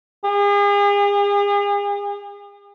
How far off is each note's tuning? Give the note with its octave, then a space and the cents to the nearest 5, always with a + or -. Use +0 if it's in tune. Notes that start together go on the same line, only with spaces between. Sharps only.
G#4 -40